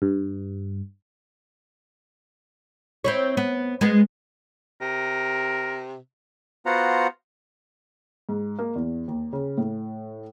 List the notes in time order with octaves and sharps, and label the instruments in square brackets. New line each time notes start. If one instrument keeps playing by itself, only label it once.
[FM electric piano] G2
[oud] C4 E4 C#5
B3
G#3 B3
[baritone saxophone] C3 [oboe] A#4
[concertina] B3 F4 F#4 C5 F#5 A#5
[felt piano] G#2
A#3
E2
D#2
C#3
A2